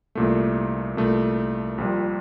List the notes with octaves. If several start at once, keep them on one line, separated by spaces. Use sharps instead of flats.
C2 A#2 A3
C2 A#2 A3
A#1 A#2 G3